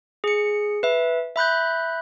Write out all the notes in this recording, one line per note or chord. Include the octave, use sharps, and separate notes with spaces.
G#4 C#7
B4 E5
E5 B5 F#6 G6